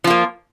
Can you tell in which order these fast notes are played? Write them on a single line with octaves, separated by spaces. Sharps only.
F3 F4 A#3